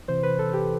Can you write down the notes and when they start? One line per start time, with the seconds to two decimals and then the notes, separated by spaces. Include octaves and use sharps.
0.08 C3 E3 C5
0.23 B4
0.39 A4
0.53 G4